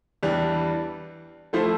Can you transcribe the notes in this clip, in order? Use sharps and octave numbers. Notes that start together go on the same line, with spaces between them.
E2 E3 G3 D4
F3 A3 E4 A4 C5